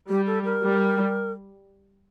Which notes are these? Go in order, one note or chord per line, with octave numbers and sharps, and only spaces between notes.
G3 G4
A4
A#4
G3